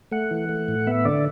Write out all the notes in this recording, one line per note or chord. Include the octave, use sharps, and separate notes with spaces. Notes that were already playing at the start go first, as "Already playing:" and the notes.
A3 F#5
E3
A3
A2
B3 E5
D3 D5